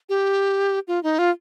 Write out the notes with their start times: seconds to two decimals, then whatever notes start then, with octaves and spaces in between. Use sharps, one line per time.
0.09 G4
0.88 F4
1.03 D#4
1.19 F4